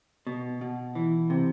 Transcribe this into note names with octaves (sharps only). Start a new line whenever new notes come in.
B2
B2
E3
C3